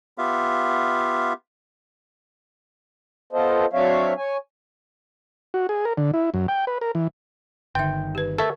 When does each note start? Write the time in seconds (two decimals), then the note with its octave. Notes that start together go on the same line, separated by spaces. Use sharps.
0.18 B3 F4 G4 E5 F5
3.33 B3 F4 A4 C5 D#5
3.73 F#3 C4 D4 C#5 E5 F5
4.17 C#5 G#5
5.54 F#4
5.69 G#4
5.85 A#4
5.97 D3
6.14 E4
6.34 F#2
6.48 G5
6.67 B4
6.81 A#4
6.95 E3
7.75 G1 D3 D#3 E5 G5
8.15 G4 B4
8.38 A4 A#4 E5 A5 C#6